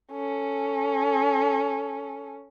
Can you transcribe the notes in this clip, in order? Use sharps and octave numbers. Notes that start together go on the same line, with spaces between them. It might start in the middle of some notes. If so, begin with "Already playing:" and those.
C#4 A4